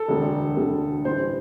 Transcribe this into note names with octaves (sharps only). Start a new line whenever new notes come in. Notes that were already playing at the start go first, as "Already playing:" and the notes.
Already playing: A4
E1 D2 D3
E1 D2 D3
A1 G2 E3 C5